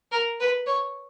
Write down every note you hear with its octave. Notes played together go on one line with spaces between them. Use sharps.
A#4
B4
C#5